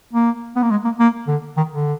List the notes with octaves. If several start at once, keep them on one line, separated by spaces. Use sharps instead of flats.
A#3
B3
A#3
G#3
A#3
A#3
D3
D#3
D3